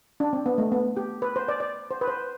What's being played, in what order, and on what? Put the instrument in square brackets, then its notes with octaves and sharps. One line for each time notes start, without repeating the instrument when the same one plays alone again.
[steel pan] D4
C4
B3
A3
B3
G4
B4
C5
D5
D5
C5
B4
C5